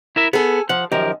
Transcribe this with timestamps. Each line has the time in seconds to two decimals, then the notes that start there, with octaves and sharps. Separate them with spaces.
0.16 E4 A#4 E5
0.33 B3 G#4 A4
0.69 F3 F#5
0.92 F#2 D#3 F3 G4 A#4